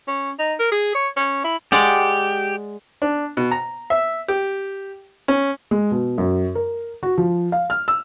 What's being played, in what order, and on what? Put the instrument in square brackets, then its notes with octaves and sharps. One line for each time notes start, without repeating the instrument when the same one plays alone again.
[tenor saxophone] C#4
D#4
A#4
G#4
C#5
C#4
E4
[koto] G#3 D5 F#5 [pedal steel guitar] G4
[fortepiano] D4
B2
A#5
E5
G4
C#4
[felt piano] G#3
B2
F#2
A#4
F#4
F3
F5
F6
E6